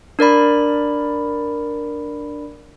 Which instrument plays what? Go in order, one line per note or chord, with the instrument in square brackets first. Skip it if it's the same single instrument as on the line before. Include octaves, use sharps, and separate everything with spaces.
[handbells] D4 A#4 D5 B5